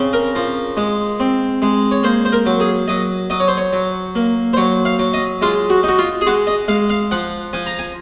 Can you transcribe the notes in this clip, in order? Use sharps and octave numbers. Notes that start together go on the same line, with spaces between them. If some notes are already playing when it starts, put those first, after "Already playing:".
Already playing: C#3 C4
A#4
F3
G#3
C4
G#3
C#5
A#3 C5
C5
A#4
F#3
G#4
F#3 D#5
F#3 D#5
C#5
C5
C#5
F#3
A#3
C5
F#3 C#5
F5
F#3
D#5
G#3 F4
F#4
D#4 F#4
F4
G#4
G#3 F#4
D#5
G#3 F5
F5
F3 F#5
F3 G#5
A#5
G#5